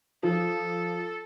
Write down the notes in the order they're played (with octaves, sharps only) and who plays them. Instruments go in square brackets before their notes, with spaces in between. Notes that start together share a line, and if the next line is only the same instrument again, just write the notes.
[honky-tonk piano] F3 [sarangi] A4